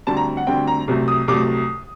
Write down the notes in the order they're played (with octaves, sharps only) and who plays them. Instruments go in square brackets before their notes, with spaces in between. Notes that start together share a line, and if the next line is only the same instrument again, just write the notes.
[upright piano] D2 D3 G3 C4 A5
A#5
F#5
D2 D3 G3 C4 G5
A#5
C2 C3 F#3 A3
D#6
C2 C3 F#3 A3 D6